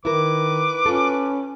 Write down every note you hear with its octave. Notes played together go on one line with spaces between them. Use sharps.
D#3 E4 A#4 B4 D6
C#4 F4 A4